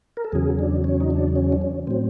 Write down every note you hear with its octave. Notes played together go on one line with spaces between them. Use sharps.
A#4
A4
E2 C#3 F#3 G#4
D4
C#4
D#4
D4
C#4
D4
C#4
A2 F#3 C4